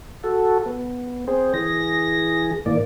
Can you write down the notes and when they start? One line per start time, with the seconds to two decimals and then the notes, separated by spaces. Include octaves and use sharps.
0.24 F#4 A4
0.66 B3
1.28 C4 G#4 C5
1.54 E3 G#4 A#6
2.66 A2 D#3 E3 A#3 D5